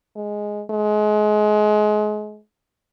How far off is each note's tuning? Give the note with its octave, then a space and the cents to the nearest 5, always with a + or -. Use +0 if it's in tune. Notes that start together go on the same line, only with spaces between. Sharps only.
G#3 +0
G#3 +30